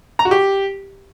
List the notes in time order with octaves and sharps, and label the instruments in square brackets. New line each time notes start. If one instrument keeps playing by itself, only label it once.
[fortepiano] A#5
F#4
G4